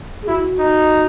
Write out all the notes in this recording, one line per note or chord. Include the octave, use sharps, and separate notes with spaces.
G#4
E4 F#4
D#4